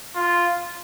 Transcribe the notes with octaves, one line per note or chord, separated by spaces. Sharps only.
F4